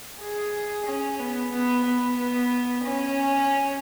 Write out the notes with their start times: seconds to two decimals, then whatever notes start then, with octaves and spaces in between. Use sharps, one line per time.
0.21 G#4
0.87 C#4
1.20 B3
1.52 B3
1.85 B3
2.18 B3
2.85 C#4